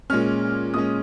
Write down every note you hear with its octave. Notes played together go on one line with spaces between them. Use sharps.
A#2 G#3 C#4 F6
A#2 G#3 C#4 D#6